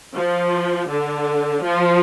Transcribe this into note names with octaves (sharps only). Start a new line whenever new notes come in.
F3
D3
F3